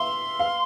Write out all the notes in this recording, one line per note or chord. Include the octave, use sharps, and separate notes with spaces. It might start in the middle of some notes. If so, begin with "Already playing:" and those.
Already playing: E5 F5 C6
F5